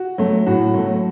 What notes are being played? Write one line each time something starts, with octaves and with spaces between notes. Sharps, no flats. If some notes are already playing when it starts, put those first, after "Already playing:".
Already playing: F#4
F#3 A3
A2 F#4
F#3 A3